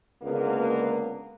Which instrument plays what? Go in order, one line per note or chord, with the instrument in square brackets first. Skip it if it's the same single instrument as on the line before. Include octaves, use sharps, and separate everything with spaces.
[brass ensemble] C#2 D3 A#3 B3